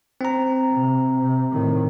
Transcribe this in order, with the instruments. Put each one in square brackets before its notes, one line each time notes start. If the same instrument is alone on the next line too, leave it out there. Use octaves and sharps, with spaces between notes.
[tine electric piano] C4 A#5
[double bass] C3
C3
A2 D#3